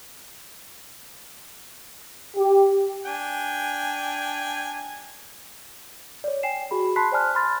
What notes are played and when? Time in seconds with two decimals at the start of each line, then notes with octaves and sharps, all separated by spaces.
2.36 G4
3.05 D4 G5 G#5
6.24 C#5 D5
6.43 G5 G#5 C7 E7
6.71 F#4 G#4 B5
6.96 A5 B5 C6 F#6 B6 C7
7.12 C5 D5 G#5 A5 F6 F#6
7.35 B5 C6 F6 A6